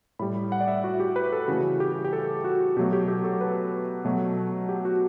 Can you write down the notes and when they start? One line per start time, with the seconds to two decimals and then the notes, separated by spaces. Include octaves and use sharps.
0.19 A2 G3 B5
0.52 F#5
0.60 D5
0.68 E5
0.84 F#4
1.00 G4
1.16 B4
1.32 A4
1.48 C#3 E3 A3 F#4
1.80 G4
2.04 G4
2.13 A4
2.44 F#4
2.77 B2 F#3 A3 G4
2.93 G4
3.08 G4
3.24 A4
3.41 B4
4.05 B2 F#3 A3
4.69 G4
4.85 F#4